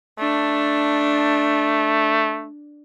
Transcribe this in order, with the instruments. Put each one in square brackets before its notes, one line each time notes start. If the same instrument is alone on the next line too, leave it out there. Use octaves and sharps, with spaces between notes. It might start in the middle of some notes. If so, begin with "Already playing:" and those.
[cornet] A3 [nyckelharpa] D4